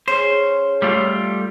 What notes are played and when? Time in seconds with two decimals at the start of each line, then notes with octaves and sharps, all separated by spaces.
0.08 C#4 G#4 C5 C#5
0.82 G3 A3 F4